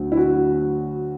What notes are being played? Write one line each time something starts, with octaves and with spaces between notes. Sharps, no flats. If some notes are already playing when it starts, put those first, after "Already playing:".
Already playing: D2 D3 F#3
E4
F#4